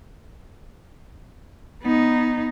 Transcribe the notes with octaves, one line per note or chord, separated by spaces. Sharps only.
B3 D#4